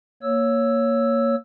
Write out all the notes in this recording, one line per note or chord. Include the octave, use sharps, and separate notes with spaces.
A#3 C#5 E6